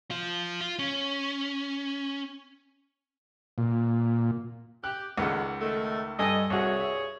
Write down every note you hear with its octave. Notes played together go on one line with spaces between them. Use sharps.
F3 F4
F4
C#4
A#2
G4 F#6
C#2 D3 D#3 G#3 F#5
D#3 A3
G2 A4 D#5 G#5
C2 G2 F#4 G#4 C#5
E5